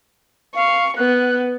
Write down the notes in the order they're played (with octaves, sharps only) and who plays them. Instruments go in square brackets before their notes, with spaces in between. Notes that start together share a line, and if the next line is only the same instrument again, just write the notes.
[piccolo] F5 [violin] C#6
[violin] B3 [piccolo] F#6